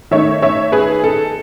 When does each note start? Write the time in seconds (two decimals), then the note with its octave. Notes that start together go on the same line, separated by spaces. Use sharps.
0.11 D#3 A3 D#4 C#5 E5
0.42 C#5 E5
0.72 G#4 B4
1.04 A4